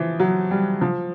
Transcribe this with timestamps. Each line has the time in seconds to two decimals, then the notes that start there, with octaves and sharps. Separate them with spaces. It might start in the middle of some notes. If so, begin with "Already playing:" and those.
Already playing: E3 F3
0.19 F#3
0.51 G3
0.81 F3